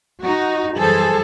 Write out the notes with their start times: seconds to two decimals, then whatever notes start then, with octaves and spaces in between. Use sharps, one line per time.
0.22 D#4 F#4
0.75 F#2 E3 G3 G#4 A4 C5